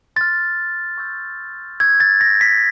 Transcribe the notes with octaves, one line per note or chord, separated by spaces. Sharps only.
C6 F6 A6
C#6 E6 G6
C#6 E6 G6 G#6
A6
A#6
B6